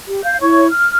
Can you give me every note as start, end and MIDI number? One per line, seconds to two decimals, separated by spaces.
0.07 0.22 67
0.23 0.37 77
0.23 0.37 91
0.41 0.67 64
0.41 0.67 73
0.41 0.67 85
0.69 0.98 89